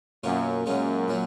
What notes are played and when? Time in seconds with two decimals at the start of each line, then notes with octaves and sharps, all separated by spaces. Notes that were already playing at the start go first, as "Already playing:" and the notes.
0.24 F#2 B2 A#3 C#4 F4
0.66 F#2 A#2 G#3 C#4 F4
1.08 A#2 F#3 C#4